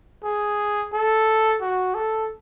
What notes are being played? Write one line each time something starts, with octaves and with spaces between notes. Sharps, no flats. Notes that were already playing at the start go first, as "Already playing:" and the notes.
G#4
A4
F#4
A4